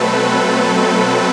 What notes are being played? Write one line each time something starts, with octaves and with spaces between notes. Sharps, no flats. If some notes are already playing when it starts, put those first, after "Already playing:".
Already playing: B2 F#3 A3 C4 A4 B4